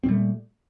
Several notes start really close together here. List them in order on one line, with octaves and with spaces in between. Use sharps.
C4 A#2 G3 A3